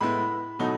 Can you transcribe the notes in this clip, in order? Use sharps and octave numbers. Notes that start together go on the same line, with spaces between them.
A2 G#3 B3 E4 B5
B2 F#3 A3 D#4